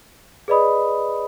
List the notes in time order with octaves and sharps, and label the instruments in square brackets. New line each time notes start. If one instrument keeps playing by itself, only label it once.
[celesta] G#4 B4 D5 D#5 B5 D#6